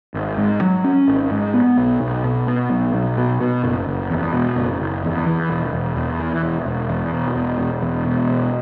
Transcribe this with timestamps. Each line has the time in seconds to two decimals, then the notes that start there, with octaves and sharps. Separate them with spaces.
0.14 G#1
0.38 G#2
0.61 F#3
0.84 C#4
1.08 G#1
1.31 G#2
1.54 B3
1.77 B1
2.01 B1
2.24 B2
2.47 B3
2.70 B1
2.94 B1
3.17 B2
3.40 B2
3.64 F#1
3.87 F#1
4.10 E2
4.33 B2
4.57 F#1
4.80 F#1
5.04 E2
5.26 E3
5.50 E1
5.73 E1
5.96 E2
6.20 E3
6.43 E1
6.66 E1
6.89 E2
7.13 B2
7.36 E1
7.59 E1
7.82 E2
8.05 B2
8.29 E1